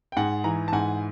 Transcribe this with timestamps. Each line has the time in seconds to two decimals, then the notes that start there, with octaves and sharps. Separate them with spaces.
0.12 G5
0.16 G#2 F#5 G#5
0.44 E3 G#5 A#5
0.68 A5
0.72 G#2 F#5 G#5